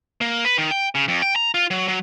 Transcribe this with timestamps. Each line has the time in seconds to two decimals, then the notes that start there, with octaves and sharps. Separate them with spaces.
0.21 A#3
0.45 B4
0.58 D#3
0.71 G5
0.95 C#3
1.08 F2
1.22 G5
1.36 A#5
1.54 F4
1.71 F#3
1.88 F#3